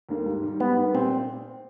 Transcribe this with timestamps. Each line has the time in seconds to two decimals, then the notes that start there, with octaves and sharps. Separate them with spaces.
0.09 D#2 D3 G3 A#3
0.26 G#2
0.43 D#3 G3
0.60 G#2 B3
0.77 D#3 G3
0.94 A#2 C4